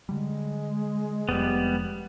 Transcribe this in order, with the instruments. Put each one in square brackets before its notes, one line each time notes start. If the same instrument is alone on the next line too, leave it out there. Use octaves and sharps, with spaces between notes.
[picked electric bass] D3 G3 [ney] G#3
[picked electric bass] F1 F2 [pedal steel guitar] G3 B3